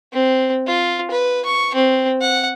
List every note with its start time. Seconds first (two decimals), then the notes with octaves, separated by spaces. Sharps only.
0.13 C4
0.67 F4
1.11 B4
1.45 C#6
1.75 C4
2.21 F#5